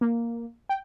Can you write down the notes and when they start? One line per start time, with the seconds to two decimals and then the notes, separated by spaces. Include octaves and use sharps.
0.01 A#3
0.69 G5